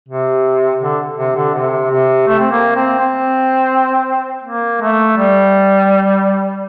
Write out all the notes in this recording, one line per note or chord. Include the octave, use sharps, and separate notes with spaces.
C3
D3
C3
D3
C3
C3
A3
C4
A#3
C4
C4
A#3
A3
G3